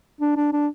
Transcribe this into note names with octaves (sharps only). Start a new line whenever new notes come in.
D4
D4
D4